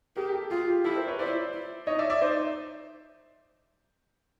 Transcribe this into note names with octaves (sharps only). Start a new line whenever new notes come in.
G4 G#4 A#4
G4 A4
F4 F#4 G#4
G4
E4 G4 A4
A#4 C5
B4 C#5
E4 C5 D5
E4
D#4 C#5 D#5
D5 E5
D5 E5
D#4 C5 D5